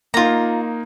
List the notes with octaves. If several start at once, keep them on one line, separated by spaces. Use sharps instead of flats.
A#3 D#4 F4 A#5